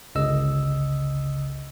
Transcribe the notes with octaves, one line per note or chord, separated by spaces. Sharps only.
G1 C#2 C#3 D#5 E6